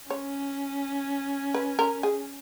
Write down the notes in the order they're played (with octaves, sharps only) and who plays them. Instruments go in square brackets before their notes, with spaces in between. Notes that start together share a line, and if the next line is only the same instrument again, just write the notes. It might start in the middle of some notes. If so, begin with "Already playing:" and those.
[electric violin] C#4 [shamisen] C#5
[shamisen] B4
A#4
G#4